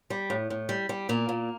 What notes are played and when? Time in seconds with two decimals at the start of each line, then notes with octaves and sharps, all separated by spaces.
0.10 G3
0.30 A2
0.50 A2
0.69 G3
0.89 G3
1.09 A#2 A#3
1.29 A#2